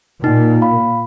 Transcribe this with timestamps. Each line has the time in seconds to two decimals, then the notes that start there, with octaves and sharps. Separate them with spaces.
0.24 A#2 D#4 G5
0.62 F5 B5